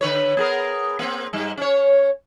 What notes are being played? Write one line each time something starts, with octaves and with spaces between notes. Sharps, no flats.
D3 B4 C#5
B3 G#4 A#4
A#3 C4
G#2 G3
C#4 C#5